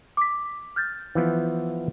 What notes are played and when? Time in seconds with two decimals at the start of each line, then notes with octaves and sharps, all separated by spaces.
0.17 D6 B6
0.76 F6 G6 A6
1.15 E3 F3 B3